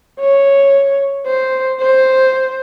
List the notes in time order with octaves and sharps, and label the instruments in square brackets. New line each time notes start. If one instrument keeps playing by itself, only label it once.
[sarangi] C#5
C5
C5